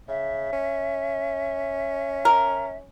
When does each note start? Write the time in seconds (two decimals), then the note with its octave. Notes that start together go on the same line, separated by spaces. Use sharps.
0.08 C#3 E5
0.53 C#4
2.25 A#4